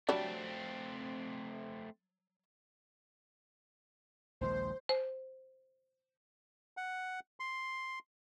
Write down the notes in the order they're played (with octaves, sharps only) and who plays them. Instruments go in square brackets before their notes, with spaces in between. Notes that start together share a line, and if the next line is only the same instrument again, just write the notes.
[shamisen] F#3 G3 D4 [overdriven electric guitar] A3 C4
[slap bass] A#1 D#2 G#3 [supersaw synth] C5
[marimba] C5
[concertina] F#5
C6